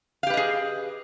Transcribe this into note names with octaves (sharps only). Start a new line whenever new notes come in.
G4 G#4 B4 D#5 F5